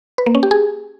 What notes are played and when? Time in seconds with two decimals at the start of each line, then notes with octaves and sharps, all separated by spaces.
0.18 B4
0.26 A#3
0.35 C#4
0.43 G4
0.51 G#4